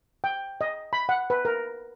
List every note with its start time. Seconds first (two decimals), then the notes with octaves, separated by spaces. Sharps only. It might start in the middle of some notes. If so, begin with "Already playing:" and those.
0.24 G5
0.61 D#5
0.93 B5
1.09 F#5
1.30 B4
1.45 A#4